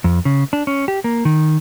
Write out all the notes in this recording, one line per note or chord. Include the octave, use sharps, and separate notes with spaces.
F2
C#3
D4
C#4
G4
A#3
D#3